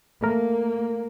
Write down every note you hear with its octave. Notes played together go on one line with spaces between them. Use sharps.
A3 A#3 A#4